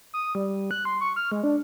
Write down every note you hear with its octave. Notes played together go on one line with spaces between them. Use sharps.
D#6
G3
F#6
C6
C#6
F6
G#3
D4